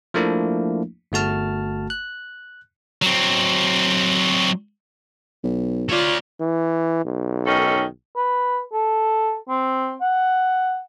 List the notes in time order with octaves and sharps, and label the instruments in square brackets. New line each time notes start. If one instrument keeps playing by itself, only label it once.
[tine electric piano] F3 A3 A#3 D4 E4
G1 A3 F#4 A5 F6
F#6
[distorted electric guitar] F#3 C4
[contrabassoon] B1
[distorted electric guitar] A3 D5 [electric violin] F4 C#5
[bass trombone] E3
B1
[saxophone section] D#3 C#4 A4
[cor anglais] B4
A4
C4
F#5